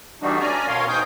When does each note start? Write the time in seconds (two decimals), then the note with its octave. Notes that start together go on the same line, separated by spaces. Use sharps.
0.22 E3 G3 A3 D4 D#4 F#4
0.40 C#4 D5 G#5 A#5
0.68 B2 A#4 C#5 F5 C6
0.88 G#2 D#4 G5 G#5 D#6 G6